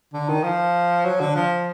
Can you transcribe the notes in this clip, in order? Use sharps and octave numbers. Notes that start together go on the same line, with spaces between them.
D3
D#3
F3
F#3
D3
F3